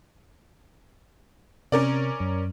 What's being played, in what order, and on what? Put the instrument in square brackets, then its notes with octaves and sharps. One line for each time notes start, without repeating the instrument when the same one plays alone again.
[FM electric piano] C3 [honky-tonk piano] C#4 A#4 D5
[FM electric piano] F#2